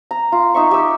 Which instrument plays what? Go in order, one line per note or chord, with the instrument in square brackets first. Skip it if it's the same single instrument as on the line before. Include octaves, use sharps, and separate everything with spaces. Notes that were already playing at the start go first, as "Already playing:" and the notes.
[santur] A#5
F4
D#4 E5 C#6
G4 E6